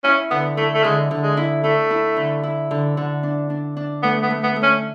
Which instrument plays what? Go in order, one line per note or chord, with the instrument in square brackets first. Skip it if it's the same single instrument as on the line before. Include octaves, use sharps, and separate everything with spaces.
[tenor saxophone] C#4 [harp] E4
[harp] D3 [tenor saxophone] B3
[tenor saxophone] A3 [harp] E4
[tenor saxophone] A3
[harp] D3 [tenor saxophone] G#3
[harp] D3
[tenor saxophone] G#3
[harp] E4
[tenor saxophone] A3 [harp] E4
[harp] E4
D3
E4
D3
D3
D4
D4
D4
[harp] A3 [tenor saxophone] B3
[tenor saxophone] B3
[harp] A3
[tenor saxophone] B3
[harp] A3
[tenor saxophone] C#4